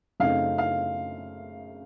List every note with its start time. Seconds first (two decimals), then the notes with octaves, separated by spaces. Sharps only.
0.20 F#2 C#3 A3 C4 D#4 F5
0.58 F5